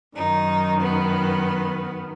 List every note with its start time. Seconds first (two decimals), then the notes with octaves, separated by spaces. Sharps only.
0.16 F#2 D#3 D#4
0.80 B3